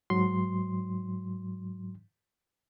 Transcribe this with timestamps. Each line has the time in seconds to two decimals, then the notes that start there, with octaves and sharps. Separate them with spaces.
0.10 G#2 F#3 C6